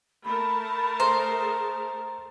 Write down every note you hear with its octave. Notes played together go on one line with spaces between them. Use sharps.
A3 A#4 A5 B5
G#4 C5 A#5